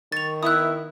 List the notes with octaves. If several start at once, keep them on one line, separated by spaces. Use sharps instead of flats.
D#3 C#6 A6 F7
B3 E4 C#6 D#6 E6 F#6